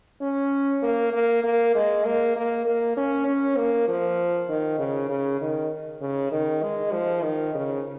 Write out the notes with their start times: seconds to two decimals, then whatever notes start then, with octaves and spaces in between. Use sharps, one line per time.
0.22 C#4
0.82 A#3
1.13 A#3
1.43 A#3
1.75 G#3
2.05 A#3
2.36 A#3
2.66 A#3
2.97 C#4
3.27 C#4
3.57 A#3
3.88 F3
4.49 D#3
4.79 C#3
5.09 C#3
5.41 D#3
6.01 C#3
6.32 D#3
6.63 G#3
6.93 F3
7.23 D#3
7.54 C#3